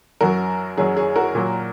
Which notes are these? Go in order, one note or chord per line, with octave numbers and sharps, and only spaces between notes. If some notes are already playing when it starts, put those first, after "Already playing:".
F#2 F#3 F#4 A#4
F#2 F#3 G#4 C#5
G#4 C#5
F#4 A#4
A#2 F#3